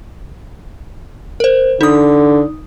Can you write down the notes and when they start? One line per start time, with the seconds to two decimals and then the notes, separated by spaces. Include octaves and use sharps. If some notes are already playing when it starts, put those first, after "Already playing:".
1.40 A#4 C5
1.81 D3 D#4 D#6